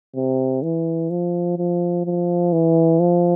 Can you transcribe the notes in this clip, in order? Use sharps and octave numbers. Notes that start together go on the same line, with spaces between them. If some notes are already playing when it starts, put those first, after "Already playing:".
C3
E3
F3
F3
F3
E3
F3